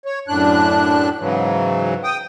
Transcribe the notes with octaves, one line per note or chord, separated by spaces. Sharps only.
C#5
F#2 A2 D4 F#6
G#2 C#3 E3 F#3
G5 D#6